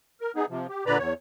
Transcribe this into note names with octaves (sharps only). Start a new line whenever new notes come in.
A#4
B3 D#4 G#4
C3 F3
G4
A#2 D3 B4 D5 A#5 B5
E2 C#5